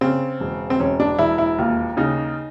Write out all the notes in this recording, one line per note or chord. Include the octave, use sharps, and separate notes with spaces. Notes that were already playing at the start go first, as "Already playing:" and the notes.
C#3 C4
E1
C4
E1 C#4
D4
E1 E4
E4
D#2 F4
C#3 D#4